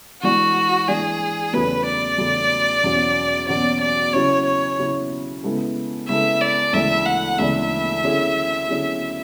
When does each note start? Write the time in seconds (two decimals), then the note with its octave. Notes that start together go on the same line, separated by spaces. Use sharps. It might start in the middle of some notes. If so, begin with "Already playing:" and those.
0.22 E3 G#3 D4 F#4
0.88 E3 G#3 D4 G#4
1.53 E2 C#3 F#3 A3 C#4 B4
1.86 D5
2.18 E2 C#3 F#3 A3 C#4
2.83 E2 B2 F#3 C#4 F#4
3.48 E2 B2 F#3 C#4 F#4 D5
3.81 D5
4.13 C#3 F#3 C#4 E4 C#5
4.46 C#5
4.78 C#3 F#3 C#4 E4
5.43 C#3 G#3 B3 E4 A4
6.08 C#3 G#3 B3 E4 A4 E5
6.41 D5
6.73 D2 C#3 E3 G#3 D4 E5
7.06 F#5
7.39 D2 C#3 E3 G#3 D4 E5
8.04 D3 F#3 C#4 E4 G#4
8.69 D3 F#3 C#4 E4 G#4